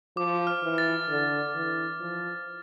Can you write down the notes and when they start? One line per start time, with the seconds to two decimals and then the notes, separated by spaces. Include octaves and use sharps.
0.17 F3 D6
0.47 F6
0.63 E3
0.78 A6
1.09 D3
1.55 E3
2.00 F3